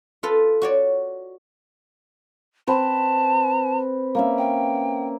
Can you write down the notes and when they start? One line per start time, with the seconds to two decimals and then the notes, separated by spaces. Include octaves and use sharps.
0.23 F4 A4 B4
0.62 F#4 C#5 D5
2.67 C4 B4 A5
4.15 A#3 C#4 E5
4.38 G5